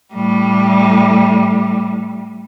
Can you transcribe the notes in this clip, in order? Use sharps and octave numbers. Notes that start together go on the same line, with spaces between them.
A2 G3